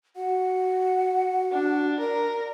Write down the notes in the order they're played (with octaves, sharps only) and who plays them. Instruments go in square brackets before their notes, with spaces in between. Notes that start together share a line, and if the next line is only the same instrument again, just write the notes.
[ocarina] F#4 [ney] F#5
[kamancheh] D4
[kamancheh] A#4 [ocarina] D5